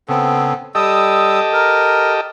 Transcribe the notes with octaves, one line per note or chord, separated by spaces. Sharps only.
C#3 B3 C4 A4
G3 G4 A4 D#5 D#6 E6
A#4